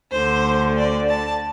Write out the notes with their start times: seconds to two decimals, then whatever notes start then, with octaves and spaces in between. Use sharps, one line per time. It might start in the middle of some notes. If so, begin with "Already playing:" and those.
0.12 D2 D3 C5
0.77 D5
1.09 A5